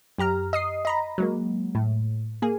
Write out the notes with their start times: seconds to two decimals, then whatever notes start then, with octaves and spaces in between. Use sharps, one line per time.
0.18 F#2 G4 A#5 F6
0.53 D#5 D#6 C7
0.85 D#5 A#5 B5
1.18 F#3 G#3 A#3
1.75 A2
2.42 A#3 G#4